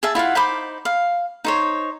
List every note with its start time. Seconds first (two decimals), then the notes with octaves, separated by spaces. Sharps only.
0.03 G#4 E5 A5
0.15 E4 F4 F5 F#5
0.35 D#4 C5 B5 D6
0.85 F5
1.44 D#4 C5 C#5